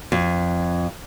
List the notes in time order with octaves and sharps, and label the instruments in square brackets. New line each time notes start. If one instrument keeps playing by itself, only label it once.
[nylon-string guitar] F2